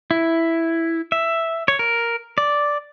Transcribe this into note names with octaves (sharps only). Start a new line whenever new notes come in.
E4
E5
C#5
A#4
D5